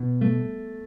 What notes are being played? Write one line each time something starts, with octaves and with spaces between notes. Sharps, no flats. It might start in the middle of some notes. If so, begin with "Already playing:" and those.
Already playing: B2
A3